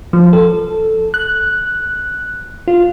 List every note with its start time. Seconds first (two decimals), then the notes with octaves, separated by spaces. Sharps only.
0.13 F3
0.33 A4
1.14 F#6
2.68 F4